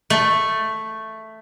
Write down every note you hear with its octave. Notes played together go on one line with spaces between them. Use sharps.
A3